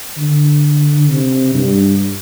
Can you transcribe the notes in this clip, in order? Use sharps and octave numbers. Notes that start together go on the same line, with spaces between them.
D3
C3
G2